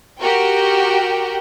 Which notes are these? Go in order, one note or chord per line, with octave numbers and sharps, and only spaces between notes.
F#4 G4 A#4 G5